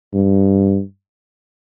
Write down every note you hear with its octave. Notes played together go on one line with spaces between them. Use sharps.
G2